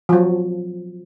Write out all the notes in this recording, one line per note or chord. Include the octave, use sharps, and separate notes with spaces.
F3 F#3